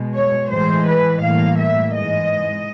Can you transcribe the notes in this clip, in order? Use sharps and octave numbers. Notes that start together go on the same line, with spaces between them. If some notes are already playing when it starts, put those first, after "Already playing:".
Already playing: B2 G#3
C#5
A2 E3 G#3 C5
B4
A2 E3 G3 A#3 F5
E5
G#2 E3 G#3 D#5